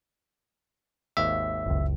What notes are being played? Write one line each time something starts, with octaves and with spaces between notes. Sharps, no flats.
G#1 D#2 E5 F5
F#1 C#2